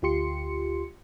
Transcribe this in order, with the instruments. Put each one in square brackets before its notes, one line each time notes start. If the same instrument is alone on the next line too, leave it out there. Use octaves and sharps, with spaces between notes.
[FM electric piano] D2 F4 G4 C6 C#7